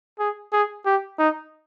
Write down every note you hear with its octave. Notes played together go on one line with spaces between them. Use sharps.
G#4
G#4
G4
D#4